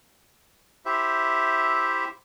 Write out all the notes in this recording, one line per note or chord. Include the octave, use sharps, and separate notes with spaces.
E4 G4 C5 E5